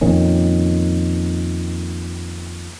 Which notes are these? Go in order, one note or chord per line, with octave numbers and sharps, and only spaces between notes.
F2 A#2 D#3 C#4